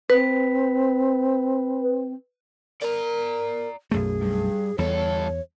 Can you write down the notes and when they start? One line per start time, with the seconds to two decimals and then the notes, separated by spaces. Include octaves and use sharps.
0.10 C4 B4
2.82 A#4 D5 A#5
3.91 B1 F#2 A3 G#4
4.21 G2
4.78 E2 G2 A4 C#5